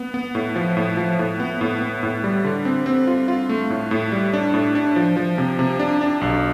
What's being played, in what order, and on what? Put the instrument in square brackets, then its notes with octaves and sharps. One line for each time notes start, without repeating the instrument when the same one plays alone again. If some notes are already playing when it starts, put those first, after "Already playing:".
Already playing: [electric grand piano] B3
B3
A2
F3
A2
F3
A2
B3
A2
B3
A2
G3
D3
C4
C4
F4
F4
A3
A2
A2
G3
D4
A2
D4
F3
F3
C3
C3
D4
D4
B1